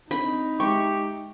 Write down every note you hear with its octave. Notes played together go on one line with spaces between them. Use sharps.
C4 D4 D#4 B5
G#3 G4 E5 C#6